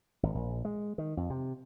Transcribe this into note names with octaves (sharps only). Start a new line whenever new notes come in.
G#1
A#1
G#3
D#3
F2
C3